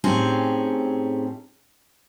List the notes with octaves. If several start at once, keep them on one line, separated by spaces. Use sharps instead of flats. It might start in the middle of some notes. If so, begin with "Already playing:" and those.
A2 C4 C#4 D#4 G4 G#4